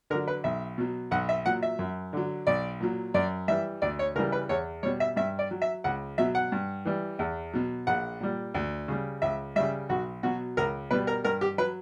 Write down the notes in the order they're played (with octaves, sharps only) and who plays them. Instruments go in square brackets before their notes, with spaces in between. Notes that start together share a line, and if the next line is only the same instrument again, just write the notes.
[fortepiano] D3 A#4
F#3
B4
B1 E5
B2 F#3
B1 F#5
E5
A#2 F#3 F#5
E5
F#2
D3 F#3
B1 D5
A#2 F#3
F#2 D5
E3 G3 E5
D2 D5
C#5
C#3 E3 G3 A#4
B4
E2 C#5
B2 G3 C#5
E5
G2 E5
D5
F#3
E5
C#2 F#5
B2 F#3 E5
F#5
G2
E3 G3
E2
B2 F#3
A#1 F#5
A#2 G3
D2
C#3 G3
C#2 E5
C#3 G3 E5
B1 F#4
B2 F#3 F#4
C#2 A#4
B2 G3 B4
A#4
G2 A#4
G4
F#3 B4